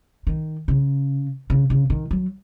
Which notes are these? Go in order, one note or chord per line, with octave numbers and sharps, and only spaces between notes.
D#3
C#3
C#3
C#3
D#3
F#3